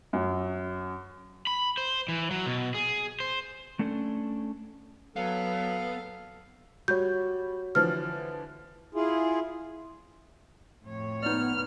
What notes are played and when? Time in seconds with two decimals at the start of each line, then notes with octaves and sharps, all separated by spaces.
0.13 F#2
1.47 B5
1.78 C5
2.08 E3
2.31 F#3
2.46 B2
2.75 G#4
3.20 C5
3.79 A3 C#4 D4 A4
5.16 F#3 B3 A4 F5
6.88 G3 F#4 C#5 G6
7.75 D3 E3 F3 F6
8.95 E4 F4 G#4
10.82 F2 A2 C#5
11.23 B3 D#4 D5 F6